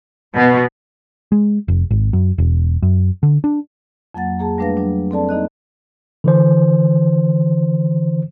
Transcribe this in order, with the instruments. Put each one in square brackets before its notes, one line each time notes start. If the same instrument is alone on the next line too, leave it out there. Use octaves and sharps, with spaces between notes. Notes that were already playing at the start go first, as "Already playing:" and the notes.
[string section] B2
[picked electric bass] G#3
F1
G#1
F#2
E1
F#2
D3
D4
[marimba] F2 F#3 A#3 F#5 A6
A#3 G#4 A5
G3 A3 D4 B4 F5 A#6
F#3 D4
C4 A4 D5 A5
A#3 D#4 D#5 F#6
[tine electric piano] D3 E3 C5